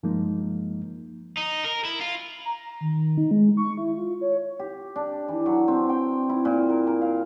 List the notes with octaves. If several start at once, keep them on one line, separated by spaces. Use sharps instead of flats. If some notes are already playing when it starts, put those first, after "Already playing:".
G2 F3 G#3 A#3 D#4
D#4
A#4
E4
F4
A#5
D#3
D#4
G#3
C#6
E4
F4
C#5
G4
D4
E3
F#3
C4
G5
E4
A#2
A#4
A#4
F5